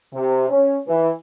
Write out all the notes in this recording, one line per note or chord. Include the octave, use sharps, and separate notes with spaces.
C3
C#4
E3